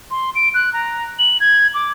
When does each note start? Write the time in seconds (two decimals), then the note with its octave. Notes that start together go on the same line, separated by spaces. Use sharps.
0.11 C6
0.35 D7
0.54 F#6
0.73 A#5
1.19 F#7
1.40 G#6
1.74 D6